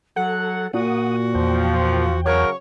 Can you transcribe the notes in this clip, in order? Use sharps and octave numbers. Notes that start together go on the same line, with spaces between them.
F#3 A4 F#5
A#2 F#4 F#5 D#6
E2 F3 G5
C#3 F#3 C#4 A#4 C#5